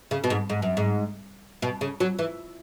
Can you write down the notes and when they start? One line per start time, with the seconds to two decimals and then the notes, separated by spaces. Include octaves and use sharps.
0.11 C#3
0.24 B2
0.30 G#2
0.50 G#2
0.62 F#2
0.77 G#2
1.62 B2
1.81 C#3
2.00 F#3
2.19 E3